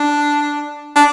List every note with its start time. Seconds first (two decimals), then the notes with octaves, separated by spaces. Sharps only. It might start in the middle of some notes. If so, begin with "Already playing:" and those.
Already playing: D4
0.96 D4